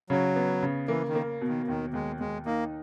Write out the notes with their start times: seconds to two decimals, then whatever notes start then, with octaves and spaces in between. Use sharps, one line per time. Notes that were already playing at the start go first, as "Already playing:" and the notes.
0.10 C#3 F#3
0.36 B3
0.62 C#3
0.88 E3 A#3
1.08 D#3
1.15 A#3
1.41 B2
1.48 D#3
1.68 D#2 D#3
1.93 D#2 G#3
2.20 D#2 G#3
2.46 A#3 D#4